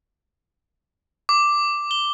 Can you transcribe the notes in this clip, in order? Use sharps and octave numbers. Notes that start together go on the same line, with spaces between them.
D6
G7